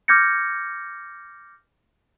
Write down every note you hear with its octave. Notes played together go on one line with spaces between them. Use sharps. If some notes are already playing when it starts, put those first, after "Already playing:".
D6 F6 G6 G#6 A#6 C#7